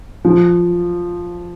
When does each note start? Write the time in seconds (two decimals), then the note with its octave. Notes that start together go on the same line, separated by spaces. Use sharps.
0.25 F3